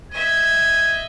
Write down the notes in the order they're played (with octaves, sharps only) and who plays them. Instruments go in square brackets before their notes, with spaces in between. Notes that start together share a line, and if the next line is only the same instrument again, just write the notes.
[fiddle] D#5 E5 [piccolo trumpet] G#6